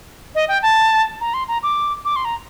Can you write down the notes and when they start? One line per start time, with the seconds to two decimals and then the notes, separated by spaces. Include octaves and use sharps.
0.35 D#5
0.48 G5
0.63 A5
1.21 A#5
1.34 C6
1.48 A#5
1.63 D6
2.05 D6
2.16 C6
2.25 A#5